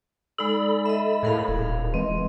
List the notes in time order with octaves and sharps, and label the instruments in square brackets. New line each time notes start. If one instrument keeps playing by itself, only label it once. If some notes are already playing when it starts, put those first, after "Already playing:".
[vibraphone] G#3 D#4 D5 [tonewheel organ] A4 B5
[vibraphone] D#5 E5
[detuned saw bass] A2 [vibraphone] G#4 A#4 F5
[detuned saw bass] D#1
[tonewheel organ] E3 G#3 [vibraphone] C4